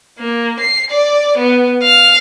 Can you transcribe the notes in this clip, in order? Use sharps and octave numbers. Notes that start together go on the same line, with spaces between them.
A#3
C7
D5
B3
F5